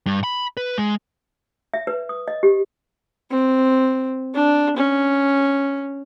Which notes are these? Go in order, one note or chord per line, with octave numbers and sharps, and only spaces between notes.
G2
B5
B4
G#3
E5
B4
D#6
D#5
G4
C4
D4
C#4